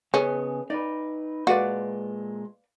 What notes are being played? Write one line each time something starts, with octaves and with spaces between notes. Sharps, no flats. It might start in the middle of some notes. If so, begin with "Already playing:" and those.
C#3 B3 C#4 G#4 B4 D#5 G#5
D#4 B4 D5
A#2 G#3 F#4 B4 D5 F5